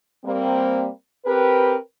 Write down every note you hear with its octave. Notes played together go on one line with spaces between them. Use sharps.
G3 A#3 C4
C4 G4 A#4 B4